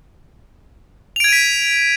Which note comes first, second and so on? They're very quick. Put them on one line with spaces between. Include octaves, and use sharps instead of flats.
F7 D7 G#6 D#7 B6